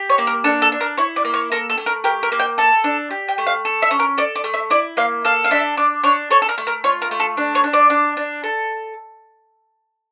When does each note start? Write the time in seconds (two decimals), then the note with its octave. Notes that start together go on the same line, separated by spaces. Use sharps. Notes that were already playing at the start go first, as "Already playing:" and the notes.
Already playing: G4
0.10 C#5
0.18 A#3
0.27 A#4
0.44 D4 A4
0.62 A4
0.72 D4
0.81 A#4
0.97 E4 C#5
1.16 D5
1.25 A#3
1.34 C#5
1.52 A4 A#4
1.70 A4
1.78 A3
1.86 A#4
2.04 G4 A#4
2.23 A#4
2.32 A#3
2.40 G5
2.58 A4 A5
2.84 D4
3.11 G4
3.28 G5
3.38 A3
3.47 F5
3.65 A4
3.82 E5
3.91 C#4
4.00 A#4
4.18 A4 D5
4.36 D5
4.44 A3
4.54 E5
4.70 E4 D5
4.97 A#3 F5
5.25 A4 F5
5.45 F5
5.51 D4 E5
5.77 D4 D5
6.04 D4 C#5
6.30 A4 C#5
6.42 A4
6.49 A#4
6.58 A3
6.67 A#4
6.84 F4 C#5
7.02 A#4
7.11 A3
7.20 A4
7.37 D4
7.55 C#5
7.64 D4
7.73 D5
7.90 D4
8.17 D4
8.44 A4